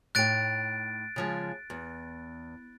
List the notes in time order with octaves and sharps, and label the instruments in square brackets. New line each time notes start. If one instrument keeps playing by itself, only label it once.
[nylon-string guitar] A2 D#4 G5 [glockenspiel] F#6 A6 D7
[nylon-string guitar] C#3 F3 G#3
E2